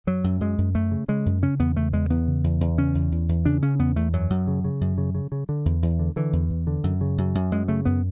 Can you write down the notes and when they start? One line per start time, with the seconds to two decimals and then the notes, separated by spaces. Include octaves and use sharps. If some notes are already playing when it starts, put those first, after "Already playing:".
0.07 F#2 F#3
0.24 F#2
0.41 F#2 G#3
0.58 F#2
0.75 F#2 A3
0.91 C#3
1.08 C#3 G#3
1.26 F#2
1.42 C#3 C#4
1.59 E2 B3
1.76 C#3 A3
1.93 E2 G#3
2.10 E2 B3
2.27 C#3
2.44 E2
2.61 E2
2.78 C#3 C#4
2.95 E2
3.12 E2
3.29 E2
3.45 C#3 D4
3.62 C#3 C#4
3.79 E2 B3
3.96 E2 A3
4.13 F#2 F#3
4.30 F#2
4.47 C#3
4.64 C#3
4.81 F#2
4.98 C#3
5.15 C#3
5.32 C#3
5.49 D3
5.65 E2
5.83 E2
5.99 D3
6.16 D3 E3
6.33 E2
6.50 E2
6.67 D3
6.84 F#2
7.01 C#3
7.18 F#2
7.35 F#2
7.51 F#2 G#3
7.68 C#3 A3
7.85 F#2 B3